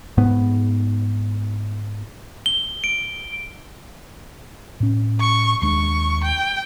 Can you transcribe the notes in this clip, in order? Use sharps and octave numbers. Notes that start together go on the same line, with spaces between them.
G#2 B3
G7
D7
A2 C#4
C#6
D#2 G#3 D4 C#6
G5